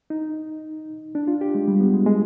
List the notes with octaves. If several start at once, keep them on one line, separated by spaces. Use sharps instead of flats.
D#4
D4
F4
G4
G#3
G3
B3
G#3
G#3